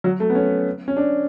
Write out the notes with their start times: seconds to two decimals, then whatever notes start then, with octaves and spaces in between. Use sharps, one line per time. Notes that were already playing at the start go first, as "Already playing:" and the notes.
0.04 F#3
0.20 A3
0.30 B3
0.35 C#4
0.88 C#4
0.97 D4